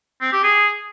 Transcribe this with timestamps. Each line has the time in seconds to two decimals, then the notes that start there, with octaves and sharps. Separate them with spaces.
0.21 C4
0.32 G4
0.43 G#4